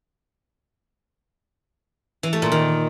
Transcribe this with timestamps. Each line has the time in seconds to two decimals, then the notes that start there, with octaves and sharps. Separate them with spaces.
2.23 E3
2.33 A3
2.42 A#2
2.52 D#3